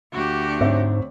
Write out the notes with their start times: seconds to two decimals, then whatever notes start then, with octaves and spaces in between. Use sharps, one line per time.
0.13 D2 D4 F#4 G4
0.61 G#2 C4 C#5 E5